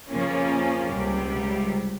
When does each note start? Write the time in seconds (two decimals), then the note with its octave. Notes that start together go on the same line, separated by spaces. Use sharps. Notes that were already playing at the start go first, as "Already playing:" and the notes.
0.09 F2 C#3 F3 A#3 C#4
0.91 C#2 C3 G3